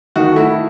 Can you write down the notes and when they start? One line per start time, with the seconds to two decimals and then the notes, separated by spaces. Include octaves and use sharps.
0.16 D#3 F#4
0.32 A3 E4